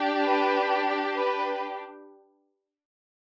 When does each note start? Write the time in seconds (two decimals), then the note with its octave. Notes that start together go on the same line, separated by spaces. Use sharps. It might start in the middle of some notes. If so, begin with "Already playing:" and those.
Already playing: D4 G4
0.26 B4
1.14 B4